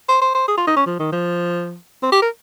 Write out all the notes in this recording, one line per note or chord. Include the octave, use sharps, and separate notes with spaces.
C5
C5
C5
G#4
F4
D#4
C#4
F3
D#3
F3
C4
G4
A#4